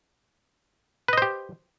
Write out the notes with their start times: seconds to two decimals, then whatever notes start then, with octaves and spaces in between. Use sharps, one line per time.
1.08 B4
1.13 D#5
1.18 C5
1.22 G4